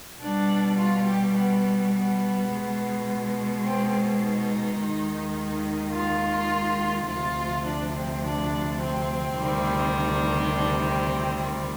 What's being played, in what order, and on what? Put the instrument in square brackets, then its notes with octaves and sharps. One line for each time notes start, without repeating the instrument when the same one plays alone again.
[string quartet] B2 G3 D4
F4
G4
B3
B3
B2 G#3
C4
D#4
D#2 D#3 G#3
F4
D2 C3 F3 F4
D4
C4
D4
C4
D2 C3 D#3 G3
D4
D4
C4